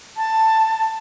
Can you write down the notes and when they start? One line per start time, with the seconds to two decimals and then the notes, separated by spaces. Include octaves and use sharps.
0.17 A5